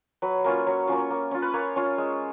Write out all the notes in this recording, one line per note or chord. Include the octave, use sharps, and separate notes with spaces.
F#3 B4
A#3 C#4 F4
F#3 C#5
A#3 C#4 F4
A#3
C#4 F4
B4
A#3 C#5
C#4 F4
G#3